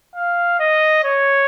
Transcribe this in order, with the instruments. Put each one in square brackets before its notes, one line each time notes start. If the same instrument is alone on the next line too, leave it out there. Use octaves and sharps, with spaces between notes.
[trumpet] F5
D#5
C#5